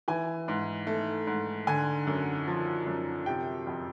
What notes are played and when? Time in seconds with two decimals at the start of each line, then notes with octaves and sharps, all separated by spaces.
0.08 E3 G#5
0.48 G#2
0.87 A3
1.27 G#2
1.67 D3 G#5
2.07 F#2
2.48 F3
2.86 F#2
3.26 C3 G5
3.67 F2